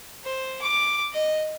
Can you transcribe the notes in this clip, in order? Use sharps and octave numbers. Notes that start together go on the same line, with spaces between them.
C5
D6
D#5